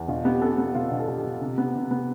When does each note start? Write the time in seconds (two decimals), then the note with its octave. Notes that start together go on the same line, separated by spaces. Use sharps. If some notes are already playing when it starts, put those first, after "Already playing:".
Already playing: E2
0.08 B2 F4
0.25 B3 G4
0.41 B3 A4
0.58 B3 G4
0.75 B2 F4
0.91 B2
0.99 A4
1.08 B2 G4
1.24 B2
1.42 C3
1.58 B3
1.75 C3
1.91 B3